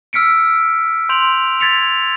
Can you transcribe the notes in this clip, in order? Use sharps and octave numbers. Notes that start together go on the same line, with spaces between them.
E6 F6 B6 C#7 D7
C6 G6 D7 F7 F#7
G#6 A6 B6 C#7 F7